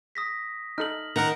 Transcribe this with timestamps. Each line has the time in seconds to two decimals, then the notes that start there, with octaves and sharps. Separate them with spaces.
0.15 D#6 A#6 B6
0.78 D#4 A4 F6 F#7
1.16 D#3 A#4 F#5 A#5